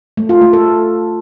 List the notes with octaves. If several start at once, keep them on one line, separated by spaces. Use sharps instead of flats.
A3
F4
A3
A4